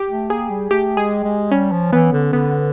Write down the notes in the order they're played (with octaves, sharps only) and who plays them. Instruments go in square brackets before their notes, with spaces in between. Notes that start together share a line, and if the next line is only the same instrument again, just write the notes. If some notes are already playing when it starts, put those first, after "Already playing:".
Already playing: [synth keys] G4
[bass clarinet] A3
[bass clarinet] A#3 [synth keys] G#4
[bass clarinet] G3
[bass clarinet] A3 [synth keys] G4
[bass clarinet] G#3 [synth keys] G#4
[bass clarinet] G#3
[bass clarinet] G3 [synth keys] C#4
[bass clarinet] F3
[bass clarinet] E3 [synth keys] B3
[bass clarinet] D3
[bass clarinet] D3 [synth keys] B3